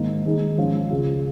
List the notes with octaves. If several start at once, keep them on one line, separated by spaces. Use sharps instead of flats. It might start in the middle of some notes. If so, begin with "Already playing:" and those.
Already playing: G#2 D#3 A#3 D#4
D#3 G#3 D#4
G#2 F3 C#4 F4
C#2 C#3 G#3 F4